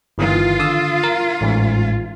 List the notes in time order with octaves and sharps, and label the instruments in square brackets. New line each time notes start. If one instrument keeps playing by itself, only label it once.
[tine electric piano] G1 D#3 E3 [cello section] F4
[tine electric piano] D3 D#6 E6
A#4
A1 G#2